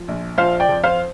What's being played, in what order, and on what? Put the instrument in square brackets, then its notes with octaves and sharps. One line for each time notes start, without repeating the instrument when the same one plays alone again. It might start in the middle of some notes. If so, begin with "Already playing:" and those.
Already playing: [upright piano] F3
A#1
F3 C5 F5
D5 G5
F2
C5 F5